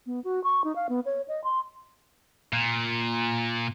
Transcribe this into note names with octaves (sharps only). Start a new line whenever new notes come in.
B3
F#4
C#6
D#4
F5
B3
C#5
D#5
C6
A#2